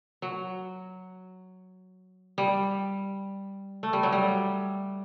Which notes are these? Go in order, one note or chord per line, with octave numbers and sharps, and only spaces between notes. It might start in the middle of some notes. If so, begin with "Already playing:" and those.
F#3
G3
A3
G3
F#3
G3